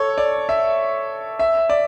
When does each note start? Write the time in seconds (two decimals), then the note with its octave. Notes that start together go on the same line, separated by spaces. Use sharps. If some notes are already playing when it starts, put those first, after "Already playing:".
Already playing: A4 C#5
0.18 D5
0.49 E5
1.39 E5
1.70 D5